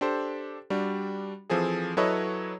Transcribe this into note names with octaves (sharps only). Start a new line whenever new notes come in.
D4 G4 A4 C5
G3 D4 F#4
E3 F3 C4 G#4 A4
F#3 E4 A4 B4 C#5 D#5